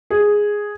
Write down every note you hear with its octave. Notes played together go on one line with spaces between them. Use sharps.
G#4